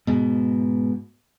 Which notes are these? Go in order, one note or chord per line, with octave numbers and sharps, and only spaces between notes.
G#2 B2